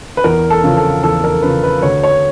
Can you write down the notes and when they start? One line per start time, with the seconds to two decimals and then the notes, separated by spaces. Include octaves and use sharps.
0.17 B4
0.24 E2 A#4
0.50 A4
0.64 C#3 F3
0.77 A4
1.03 E2 A4
1.24 A#4
1.43 C#3 F3 B4
1.63 B4
1.82 D2 C#5
2.03 C#5